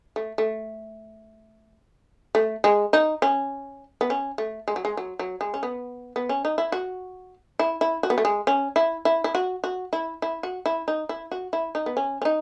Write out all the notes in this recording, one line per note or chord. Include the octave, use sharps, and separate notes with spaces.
A3
A3
A3
G#3
D#4
C#4
B3
C#4
A3
G#3
F#3
G#3
F#3
F#3
G#3
C#4
B3
B3
C#4
D#4
E4
F#4
E4
E4
F#4
B3
A3
G#3
C#4
E4
E4
E4
F#4
F#4
E4
E4
F#4
E4
D#4
E4
F#4
E4
D#4
B3
C#4
C#4
D#4